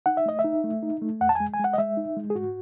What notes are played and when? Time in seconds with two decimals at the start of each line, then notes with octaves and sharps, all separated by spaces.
0.06 D#4 F#5
0.17 E5
0.26 A3 D#5
0.39 E5
0.44 D#4
0.64 A3
0.83 D#4
1.02 A3
1.21 E2 F#5
1.29 A5
1.35 G#3 G#5
1.54 G#5
1.59 G#3 F#5
1.73 D#5
1.78 G#3 E5
1.97 D#4
2.17 G#3
2.30 G#4
2.35 G#2 F#4